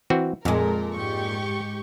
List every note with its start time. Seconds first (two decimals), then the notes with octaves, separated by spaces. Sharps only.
0.10 E3 C4 F#4
0.45 F2 A#2 G#3 A4 A#4
0.94 G#2 G4 C#6